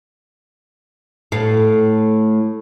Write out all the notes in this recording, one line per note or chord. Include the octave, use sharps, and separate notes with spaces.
A2 F5